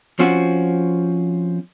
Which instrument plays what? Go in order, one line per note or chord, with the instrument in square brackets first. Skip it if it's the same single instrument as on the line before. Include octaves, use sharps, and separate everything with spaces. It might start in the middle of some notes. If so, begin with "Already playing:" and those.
[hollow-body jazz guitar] F3 C4 C#4 F4 F#4